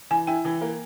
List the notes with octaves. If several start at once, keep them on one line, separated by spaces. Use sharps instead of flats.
E3 G#5
E4 G5
E3
A#3